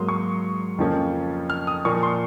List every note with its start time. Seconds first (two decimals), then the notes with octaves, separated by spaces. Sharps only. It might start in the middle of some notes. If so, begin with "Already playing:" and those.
Already playing: G#2 F#3 A#3 C6 D#6
0.09 C#6
0.78 F2 C#3 F3 A#3 C#4
1.50 F6
1.67 D#6
1.85 A#2 F3 A#3 C#6
2.03 C6